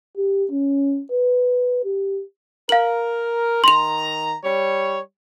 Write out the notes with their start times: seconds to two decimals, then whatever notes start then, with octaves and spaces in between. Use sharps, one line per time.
0.17 G4
0.52 C#4
1.12 B4
1.85 G4
2.69 A#4 F5 F#7
3.64 D#3 A#5 C6 F7
4.44 G3 C#5